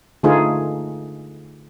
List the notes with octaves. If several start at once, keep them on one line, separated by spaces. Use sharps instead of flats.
D3 A3 D#4 F4 G#4